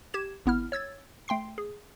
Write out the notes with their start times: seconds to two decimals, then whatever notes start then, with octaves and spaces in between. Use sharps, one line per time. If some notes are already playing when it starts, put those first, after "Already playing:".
0.14 G4 G#6 E7
0.46 G#1 B3 E4 F6
0.72 C#5 E6 G#6 A6
1.28 A3 G5 C6 C7
1.58 G#4